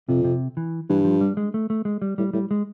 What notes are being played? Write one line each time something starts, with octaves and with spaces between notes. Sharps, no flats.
F2 C3
C3
E3
G2 E3
F3
G3
G#3
A3
A3
G#3
G3
A2 G3
A2 G3
G#3